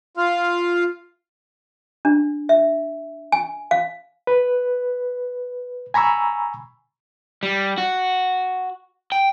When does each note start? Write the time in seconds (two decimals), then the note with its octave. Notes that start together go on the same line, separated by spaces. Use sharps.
0.17 F4 F5
2.05 D4
2.49 E5
3.32 G#5
3.71 F5
4.27 B4
5.94 G#5 A#5 B5 C#6 E6
7.43 G3
7.78 F#4
9.12 G5